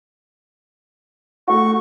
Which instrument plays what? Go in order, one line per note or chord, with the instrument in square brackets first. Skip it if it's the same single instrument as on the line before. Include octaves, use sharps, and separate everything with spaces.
[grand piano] A3 F#4 [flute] C#6